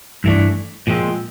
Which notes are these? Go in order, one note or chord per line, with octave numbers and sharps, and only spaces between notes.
G2 E3 A3 D4
A#2 F3 G#3 C4